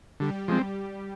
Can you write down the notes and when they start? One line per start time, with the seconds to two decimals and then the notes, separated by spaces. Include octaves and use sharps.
0.20 D3 G3 G4
0.48 F3 G#3 C4